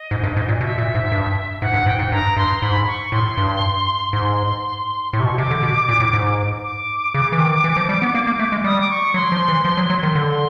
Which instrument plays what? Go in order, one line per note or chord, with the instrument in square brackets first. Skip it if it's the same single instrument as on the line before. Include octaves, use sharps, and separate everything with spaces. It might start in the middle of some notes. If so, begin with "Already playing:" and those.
Already playing: [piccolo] D#5
[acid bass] G#2
G2
G#2
A#2
[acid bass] B2 [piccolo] E5
[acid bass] A#2
G#2
G2
[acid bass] G#2 [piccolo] F#5
[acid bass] G2
[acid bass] G#2 [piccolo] G5
[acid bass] G#2
[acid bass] G2 [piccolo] A#5
[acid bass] G2 [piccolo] C6
[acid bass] G#2 [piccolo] B5
[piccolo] C#6
[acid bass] A2 [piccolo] C6
[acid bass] G2
[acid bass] G#2 [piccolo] C6
[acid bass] A2 [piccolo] C#6
[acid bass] C3
B2
[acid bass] C3 [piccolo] D6
[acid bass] D3
B2
A#2
A2
G#2
[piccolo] D6
[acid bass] C#3
E3
D#3
E3
F3
G3
B3
A#3
A#3
A3
G#3
[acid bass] G3 [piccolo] D#6
[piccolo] D6
C#6
[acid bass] F#3 [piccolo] C6
[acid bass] F3
E3
F3
F#3
F#3
D#3
[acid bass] D3 [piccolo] C6